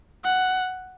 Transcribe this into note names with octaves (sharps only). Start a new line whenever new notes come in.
F#5